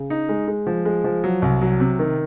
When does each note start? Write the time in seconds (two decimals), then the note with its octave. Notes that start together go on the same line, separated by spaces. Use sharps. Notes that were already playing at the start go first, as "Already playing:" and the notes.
Already playing: C#3
0.10 D#4
0.29 G#3
0.48 G#3
0.67 F3
0.85 G#3
1.04 F3
1.24 F#3
1.42 C2
1.61 F#3
1.80 C3
1.99 D#3